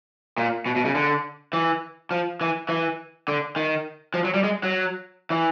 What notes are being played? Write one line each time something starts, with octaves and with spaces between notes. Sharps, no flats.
A#2
B2
B2
C#3
D3
E3
F3
E3
E3
D3
D#3
F3
F#3
G3
G#3
F#3
E3